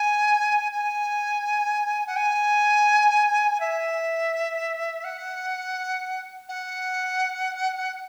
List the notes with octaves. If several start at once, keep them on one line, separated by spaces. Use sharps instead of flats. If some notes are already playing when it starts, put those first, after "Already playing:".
Already playing: G#5
G#5
F#5
G#5
E5
F#5
F#5
F#5